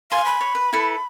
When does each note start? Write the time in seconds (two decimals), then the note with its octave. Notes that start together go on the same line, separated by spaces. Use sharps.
0.12 F5 G#5 C6
0.25 B5
0.41 C#5
0.55 B4
0.73 E4 A4 B4